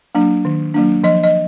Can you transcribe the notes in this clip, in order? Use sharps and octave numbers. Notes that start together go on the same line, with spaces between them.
F#3 A#3 D4
D#3
F#3 A#3 D4
F3 D#5
D#5